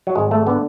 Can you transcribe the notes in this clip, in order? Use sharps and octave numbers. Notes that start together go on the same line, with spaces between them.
F#3
G#1 G#3
A3
D3 B3